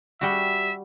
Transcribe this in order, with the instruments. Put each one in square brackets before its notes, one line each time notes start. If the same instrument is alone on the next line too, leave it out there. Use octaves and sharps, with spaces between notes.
[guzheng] G3 F#4 [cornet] E5